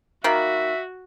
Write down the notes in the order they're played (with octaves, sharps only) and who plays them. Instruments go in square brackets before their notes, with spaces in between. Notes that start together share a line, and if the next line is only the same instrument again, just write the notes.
[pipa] D#3 A#3 B5 [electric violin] F#4 [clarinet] E5